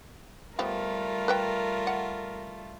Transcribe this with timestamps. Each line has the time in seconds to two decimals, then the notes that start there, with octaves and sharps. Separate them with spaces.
0.59 F3 G3 A3 B3 F4 G4 A#4
1.28 B4 E5 G5
1.87 F#5